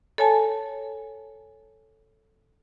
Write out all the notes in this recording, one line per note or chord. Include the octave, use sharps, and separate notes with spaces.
A4 C#5 G#5 A5